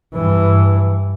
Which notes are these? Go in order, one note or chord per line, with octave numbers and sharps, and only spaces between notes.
G2 E3